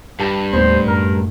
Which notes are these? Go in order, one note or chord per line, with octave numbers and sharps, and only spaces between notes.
G2 G4 A5
D#2 A2 B3 C5
F#2 A#4